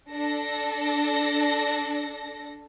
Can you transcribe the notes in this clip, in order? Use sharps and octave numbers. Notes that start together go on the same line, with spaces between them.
D4 A4 A#6